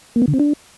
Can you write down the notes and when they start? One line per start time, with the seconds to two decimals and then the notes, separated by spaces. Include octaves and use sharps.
0.16 A#3
0.22 B3
0.28 D3
0.34 C4
0.39 D4